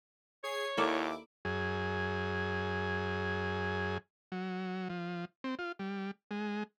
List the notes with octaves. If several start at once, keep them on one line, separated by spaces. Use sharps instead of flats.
G#4 C#5 G#6 C7
D#2 A#3 E4 A4 D5 D6
F#2 G#4
F#3
F3
C4
F4
G3
G#3